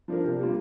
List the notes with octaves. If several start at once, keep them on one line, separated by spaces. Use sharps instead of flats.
F3 D4 A#4
C3
G3 A#3 F4